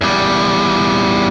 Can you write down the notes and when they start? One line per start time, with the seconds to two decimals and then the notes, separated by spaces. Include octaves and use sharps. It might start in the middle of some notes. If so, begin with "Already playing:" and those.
0.01 E2 G3